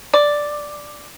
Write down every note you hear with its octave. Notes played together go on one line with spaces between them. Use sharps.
D5